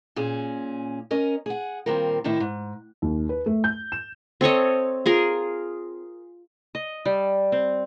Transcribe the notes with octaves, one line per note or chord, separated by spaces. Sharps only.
A#2 C#4 G#4
C#4 A#4 D#5
G#4 F#5
A#2 D#3 G3 C4 F4 A#4
A2 C3 D#3 D#4 E4
G#2
D#2
B4
A3
G6
E7
C4 A4 C#5 D#5
F4 G#4 A#4
D#5
G3
C4